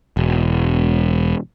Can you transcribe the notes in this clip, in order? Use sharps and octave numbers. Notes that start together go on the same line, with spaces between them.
E1